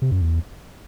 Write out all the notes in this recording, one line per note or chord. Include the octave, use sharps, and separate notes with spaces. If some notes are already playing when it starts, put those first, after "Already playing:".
C3
F#2
E2